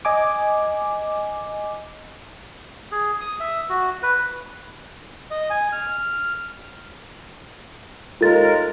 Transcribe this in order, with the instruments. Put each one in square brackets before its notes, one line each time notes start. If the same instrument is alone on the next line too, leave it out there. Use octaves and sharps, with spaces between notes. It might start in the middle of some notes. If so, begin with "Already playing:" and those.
[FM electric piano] D#5 G#5 D6
[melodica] G#4
D#6
E5
F#4
B4
[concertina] D#5
G#5
F6
[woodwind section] D#2 G#3 A#4 [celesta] F4 A4 A6